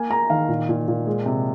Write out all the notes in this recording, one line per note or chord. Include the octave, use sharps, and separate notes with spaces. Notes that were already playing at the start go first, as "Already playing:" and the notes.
Already playing: A#3 G#5
A#3 A#5
D#3 F5
A#2
A#2
A#2
G#3
C3